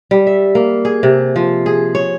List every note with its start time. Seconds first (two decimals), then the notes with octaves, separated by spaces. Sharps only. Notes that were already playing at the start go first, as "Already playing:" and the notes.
0.11 G3
0.27 E5
0.55 A#3
0.85 G#4
1.03 C3
1.36 F3
1.66 G#4
1.95 C#5